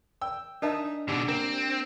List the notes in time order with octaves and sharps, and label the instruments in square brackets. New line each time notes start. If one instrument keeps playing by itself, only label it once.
[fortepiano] G5 E6
[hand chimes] D4 [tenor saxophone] D#4 [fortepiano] A#4 E5 A5
[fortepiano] G#2 [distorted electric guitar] B2 D3 [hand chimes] D4 [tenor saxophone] G4
[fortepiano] A#3 [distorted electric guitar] C4